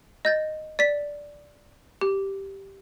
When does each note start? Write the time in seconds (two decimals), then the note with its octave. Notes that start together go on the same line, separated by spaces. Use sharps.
0.25 D#5 G6 A6
0.79 D5 B6
2.01 G4